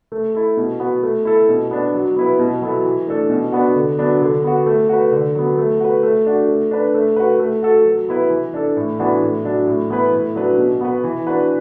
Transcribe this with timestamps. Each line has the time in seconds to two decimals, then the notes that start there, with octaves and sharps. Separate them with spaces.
0.12 A3
0.35 E4 A4
0.57 B2
0.80 B3 F#4 B4
1.03 A3
1.25 E4 A4
1.49 B2
1.71 B3 D4
1.94 F#3
2.16 B3 E4 B4
2.39 B2
2.62 F#3 B3 E4 A4
2.85 E3
3.07 A3 D4 A4
3.30 B2
3.52 B3 D4 F#4
3.76 D3
3.99 F#3 B3 D4
4.22 D3
4.44 B3 F#4
4.66 A3
4.89 F#4 B4
5.12 D3
5.35 F#3 B3
5.58 A3
5.80 F#4 B4
6.03 A3
6.26 D4 F#4
6.48 A3
6.71 D4 B4
6.94 A3
7.16 F#4 B4
7.39 A3
7.63 F#4 A4
7.85 F#3
8.08 B3 E4 B4
8.30 E3
8.54 D4 A4
8.77 A2
8.99 E3 B3 D4 F#4
9.22 A2
9.45 F#3 D4
9.67 A2
9.90 E3 B3 E4 B4
10.13 A2
10.35 F#3 D4 B4
10.58 B2
10.81 B3 F#4 B4
11.04 E3
11.27 D4 F#4 B4